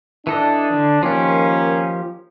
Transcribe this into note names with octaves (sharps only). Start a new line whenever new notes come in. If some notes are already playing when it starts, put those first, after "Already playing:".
E3 D4 A4 D#5
D3
D#3 F3 A#3 C#4 G4